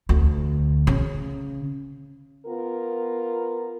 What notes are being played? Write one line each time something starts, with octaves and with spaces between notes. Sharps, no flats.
D2
C#3
B3 F4 A#4